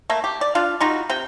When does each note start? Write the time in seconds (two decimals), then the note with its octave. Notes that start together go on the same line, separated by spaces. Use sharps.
0.10 A3 A#3
0.24 G4
0.41 D5
0.55 D4 F4 F5
0.80 G3 D#4 F4 F#4
1.09 C3 G5